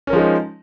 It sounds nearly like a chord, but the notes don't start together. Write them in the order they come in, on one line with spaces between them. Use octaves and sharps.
C#4 A#4 F3 G#3 D#4